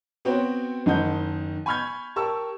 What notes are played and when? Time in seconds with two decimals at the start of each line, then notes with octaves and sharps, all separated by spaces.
0.25 B3 C4 F#4 C#5 G5
0.86 F#1 D#3 D#5 F#5 G6
1.66 G#5 B5 C#6 F6 G6 G#6
2.16 G4 A#4 A5 C#6 E6